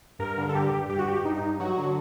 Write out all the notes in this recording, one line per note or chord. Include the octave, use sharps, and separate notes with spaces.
G2 A#4
D3
A4
G2 G4
G2
G2 G4
F#4
G2 G4
G2 D#4
G2
F#3 F#4
D3